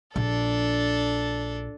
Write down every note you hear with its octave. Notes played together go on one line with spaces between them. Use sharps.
A#1 D4 A4